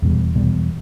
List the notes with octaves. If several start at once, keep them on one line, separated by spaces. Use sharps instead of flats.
E2 B2 G3
E2 B2 G3